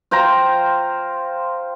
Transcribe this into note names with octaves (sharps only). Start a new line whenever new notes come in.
F4 C5 G5 A#5